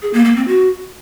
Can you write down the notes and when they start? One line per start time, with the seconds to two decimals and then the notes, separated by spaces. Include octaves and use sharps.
0.02 G#4
0.13 A#3
0.25 A#3
0.36 C4
0.47 F#4